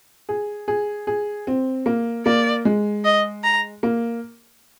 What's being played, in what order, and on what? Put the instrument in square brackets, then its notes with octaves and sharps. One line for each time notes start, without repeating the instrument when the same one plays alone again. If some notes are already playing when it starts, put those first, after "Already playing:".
[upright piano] G#4
G#4
G#4
C4
A#3
[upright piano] A#3 [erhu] D5
[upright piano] G#3
[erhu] D#5
A#5
[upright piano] A#3